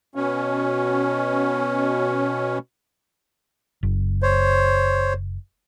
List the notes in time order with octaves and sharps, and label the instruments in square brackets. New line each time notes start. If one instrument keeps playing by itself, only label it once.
[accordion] B2 C#4
[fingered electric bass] F#1
[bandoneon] C5 C#5